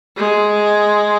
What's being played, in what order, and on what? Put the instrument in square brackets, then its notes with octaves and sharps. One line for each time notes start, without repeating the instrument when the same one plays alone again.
[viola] G#3